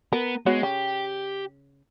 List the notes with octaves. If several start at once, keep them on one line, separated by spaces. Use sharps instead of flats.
B3 A#4
G#3 B3 F#4 C#5
C#3 G4